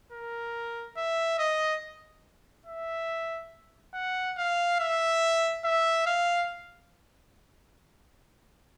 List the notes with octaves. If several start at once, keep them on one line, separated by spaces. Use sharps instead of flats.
A#4
E5
D#5
E5
F#5
F5
E5
E5
F5